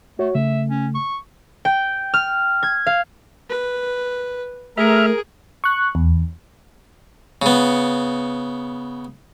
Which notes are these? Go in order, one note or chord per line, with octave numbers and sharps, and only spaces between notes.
A3 F#4 C#5
C#3 A3 E5
C#4
C#6
G5
F6
G#6
F5
B4
A3 G#4 A#4 E5 B5 F6
C#6 F#6
E2
C#3 B3